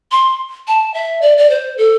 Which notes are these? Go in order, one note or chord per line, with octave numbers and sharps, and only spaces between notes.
C6
A5
E5
D5
D5
C5
A4